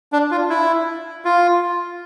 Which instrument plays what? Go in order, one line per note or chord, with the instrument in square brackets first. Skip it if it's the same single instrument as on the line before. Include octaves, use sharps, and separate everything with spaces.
[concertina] D4
F4
E4
F4